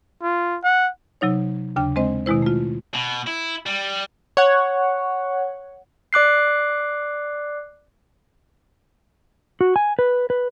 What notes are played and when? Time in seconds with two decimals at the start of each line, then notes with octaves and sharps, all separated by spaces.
0.22 F4
0.64 F#5
1.21 C3 F#3 D#4 C#5
1.76 D#2 C#3 D4 G5
1.96 G#3 C4 C5 D#5
2.26 B2 D#3 G#3 E4 C5
2.42 A3 F4
2.94 B2
3.27 E4
3.66 G3
4.37 C#5 F#5
6.13 D5 D6 F#6 C7
9.61 F#4
9.76 G#5
9.99 B4
10.30 B4